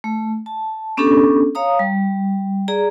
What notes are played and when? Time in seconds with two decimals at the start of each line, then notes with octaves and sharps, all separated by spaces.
0.04 A3
0.46 A5
0.97 B3 C#4 D4 G4 A4
1.55 C#5 F5 A#5 D#6
1.79 G3
2.68 G#4 D5 A#5